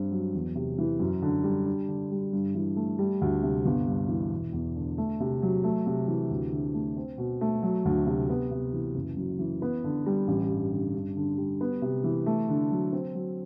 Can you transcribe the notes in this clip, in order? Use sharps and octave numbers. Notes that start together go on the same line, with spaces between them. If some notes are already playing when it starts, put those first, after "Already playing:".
Already playing: G2 C4
F#3
E2
C3
E3
F#2
D3
G3
D4
D3
G3
G2
E3
A3
G3
D2
C3
G1
G2
E3
E1
E2
D3
A3
C3
F#3
A3
C3
E3
D2
D3
A3
C4
B2
A3
F#3
D2
C3
B3
C3
E3
F#1
F#2
E3
B3
D3
G3
A1
G2
D3
G2
D3
G3
B3
C3
E3
A3
D3
F#3
C4
F#3